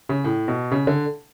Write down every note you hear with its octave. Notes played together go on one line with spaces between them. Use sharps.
C#3
A2
B2
C#3
D3